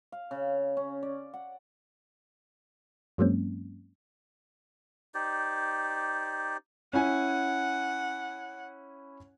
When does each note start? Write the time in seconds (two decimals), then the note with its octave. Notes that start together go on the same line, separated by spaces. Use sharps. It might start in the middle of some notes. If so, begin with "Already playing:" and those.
0.12 F5
0.31 C#3
0.77 C#4
1.03 D5
1.34 F#5
3.18 G2 F#3 G#3 A#3 C4 C#4
5.14 D#4 G4 C5 D5
6.93 C#4 E4 F#5 G#5